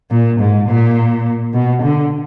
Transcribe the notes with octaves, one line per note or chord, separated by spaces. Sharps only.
A#2
G#2
A#2
B2
D3